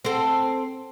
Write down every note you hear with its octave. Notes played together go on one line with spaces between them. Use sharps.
C4 A4